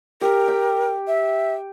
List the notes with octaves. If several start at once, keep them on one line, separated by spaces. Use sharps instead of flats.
G4 A#4
G5
E5